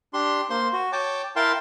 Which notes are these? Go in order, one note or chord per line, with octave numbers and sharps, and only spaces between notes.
D4 G4 C6
A#3 C5 C6
F#4
C#5 G5 A5 D6
E4 A#4 F5 G5 A5 C6